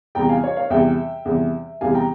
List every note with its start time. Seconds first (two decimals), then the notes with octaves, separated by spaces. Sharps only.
0.15 E2 C3 G3 G5 A#5
0.29 F5 G#5
0.43 C#5 F5
0.56 C#5 F5
0.70 E2 C3 G3 E5 G5
1.25 E2 C3 G3
1.81 E2 C3 G3 F5 G#5
1.95 G5 A#5